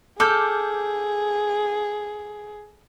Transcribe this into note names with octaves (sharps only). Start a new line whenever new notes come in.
G#4 A4 D6 F6 G6